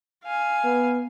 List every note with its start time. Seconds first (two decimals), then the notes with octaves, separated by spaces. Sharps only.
0.24 F5 G#5
0.64 B3